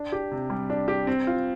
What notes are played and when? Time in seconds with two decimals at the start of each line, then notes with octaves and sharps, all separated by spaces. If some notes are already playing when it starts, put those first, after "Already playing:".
Already playing: D4
0.12 G4
0.32 C3
0.50 G3
0.70 D4
0.88 G4
1.07 C4
1.27 F4